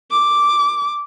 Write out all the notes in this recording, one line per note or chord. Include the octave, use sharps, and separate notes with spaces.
D6